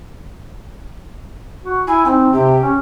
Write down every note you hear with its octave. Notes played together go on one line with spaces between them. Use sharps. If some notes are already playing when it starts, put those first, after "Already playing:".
F#4
E4 G#5
C4 D#4
C3 G4
C#4